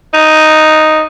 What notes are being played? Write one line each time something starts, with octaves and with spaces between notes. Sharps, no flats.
D#4